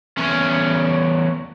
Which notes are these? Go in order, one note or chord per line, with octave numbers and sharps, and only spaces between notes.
E2 C#4